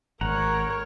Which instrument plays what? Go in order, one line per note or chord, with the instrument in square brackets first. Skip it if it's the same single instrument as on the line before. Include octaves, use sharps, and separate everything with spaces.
[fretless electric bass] G#1 [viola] A#4 C#5 [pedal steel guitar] F#5 A#5